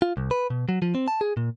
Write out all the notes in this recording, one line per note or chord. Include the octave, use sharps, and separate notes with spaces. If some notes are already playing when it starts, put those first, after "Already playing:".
F4
C2
B4
B2
F#3
F3
C4
A5
G#4
A#2